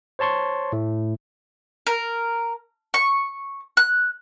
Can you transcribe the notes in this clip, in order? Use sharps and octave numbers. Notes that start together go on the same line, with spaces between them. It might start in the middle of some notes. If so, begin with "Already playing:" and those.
C5 C#5 A5 C6 C#6
A2 A3
A#4
C#6
F#6